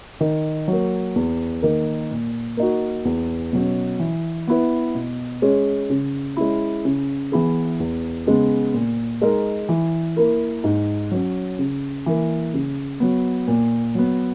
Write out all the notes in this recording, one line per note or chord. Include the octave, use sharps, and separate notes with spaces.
D#3
F#3 A#3
E2
D#3 A#3
A#2
A#3 D#4 F#4
E2
B2 F#3 C#4
E3
B3 E4 B4
B2
G#3 C#4 G#4
C#3
G#3 C#4 E4
C#3
E3 B3 E4 G#4
E2
C#3 G#3 B3
A#2
G#3 D#4 A#4
E3
A#3 E4 A#4
G#2
F#3 C#4
C#3
E3 A#3
C#3
F#3 B3
A#2
F#3 B3